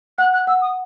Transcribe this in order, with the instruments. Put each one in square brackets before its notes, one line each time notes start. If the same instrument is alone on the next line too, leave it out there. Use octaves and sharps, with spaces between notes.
[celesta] F#5 [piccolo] F#6
[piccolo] F#6
[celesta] F#5 [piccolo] E6
[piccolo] D#6